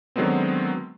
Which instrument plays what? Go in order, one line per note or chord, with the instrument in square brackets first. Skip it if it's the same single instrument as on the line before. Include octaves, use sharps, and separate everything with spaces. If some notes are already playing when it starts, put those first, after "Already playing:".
[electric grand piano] D3 D#3 F#3 G#3 B3 C4